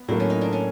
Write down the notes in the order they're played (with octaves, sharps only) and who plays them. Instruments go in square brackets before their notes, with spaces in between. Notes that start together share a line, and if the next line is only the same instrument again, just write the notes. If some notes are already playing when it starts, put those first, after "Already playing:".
Already playing: [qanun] B3
[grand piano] A2 F#3 A#3 [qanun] D4
[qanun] C#4
D#4
D4
C#4